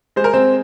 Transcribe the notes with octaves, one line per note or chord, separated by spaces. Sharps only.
G#3 C5
A#4
C4 C5